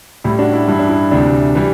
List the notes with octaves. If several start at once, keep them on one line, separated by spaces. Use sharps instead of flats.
A2 G3 E4
D4 F#4
E4
G2 E3 G3 E4
D4
E4
D2 C3 E3 G3 D4
E3 G3